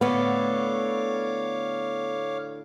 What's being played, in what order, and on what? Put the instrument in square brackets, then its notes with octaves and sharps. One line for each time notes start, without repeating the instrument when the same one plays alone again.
[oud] D2 A2 D3 [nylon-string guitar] B3 [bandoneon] C#5 F5 D6